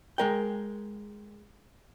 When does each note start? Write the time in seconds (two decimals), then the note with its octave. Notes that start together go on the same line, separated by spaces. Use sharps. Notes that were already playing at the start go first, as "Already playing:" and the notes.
0.18 G#3 A#4 G5